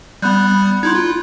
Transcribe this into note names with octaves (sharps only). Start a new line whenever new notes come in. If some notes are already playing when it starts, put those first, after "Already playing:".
G3 B3 B5 F#6 G6
D#4 E4 C6 G6 G#6
F4